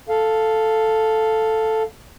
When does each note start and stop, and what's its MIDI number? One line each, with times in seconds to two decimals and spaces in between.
0.09 1.83 69
0.09 1.83 77